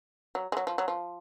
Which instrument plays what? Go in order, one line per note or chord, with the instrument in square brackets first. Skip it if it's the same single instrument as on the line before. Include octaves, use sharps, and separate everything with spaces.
[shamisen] F#3
G#3
F#3
F3
F#3
F3